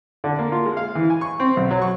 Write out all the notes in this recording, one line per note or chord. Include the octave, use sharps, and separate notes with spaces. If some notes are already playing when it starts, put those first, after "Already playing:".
D3
A#3
F4
G#3
F5
E3
G#5
C#6
C4
B1
F#3
C#6